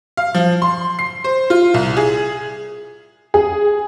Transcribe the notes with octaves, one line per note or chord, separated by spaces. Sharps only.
F5
F3
C6
C7
C5
F4
C2
G#4
G#4